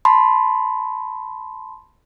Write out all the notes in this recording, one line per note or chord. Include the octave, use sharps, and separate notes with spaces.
A5 B5 C6